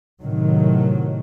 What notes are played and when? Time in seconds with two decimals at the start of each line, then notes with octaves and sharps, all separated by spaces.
0.22 A2 C3 D#3 F#3